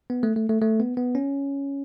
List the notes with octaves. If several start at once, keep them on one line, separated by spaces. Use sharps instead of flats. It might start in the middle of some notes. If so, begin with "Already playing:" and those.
B3
A3
A3
A3
A3
B3
B3
C#4